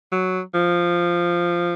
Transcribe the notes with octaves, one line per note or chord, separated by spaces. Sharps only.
F#3
F3